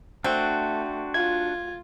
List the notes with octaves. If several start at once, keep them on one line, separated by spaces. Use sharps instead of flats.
A3 C4 D4 F#4
F4 G#6